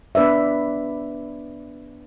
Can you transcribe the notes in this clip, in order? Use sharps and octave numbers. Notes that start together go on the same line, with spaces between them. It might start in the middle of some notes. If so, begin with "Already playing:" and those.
B3 D4 B4 D5 E5